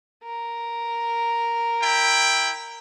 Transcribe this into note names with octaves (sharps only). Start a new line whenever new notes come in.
A#4
E4 G5